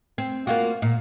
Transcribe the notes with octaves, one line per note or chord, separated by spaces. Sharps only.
C4
A#3 F4 F#4
A#2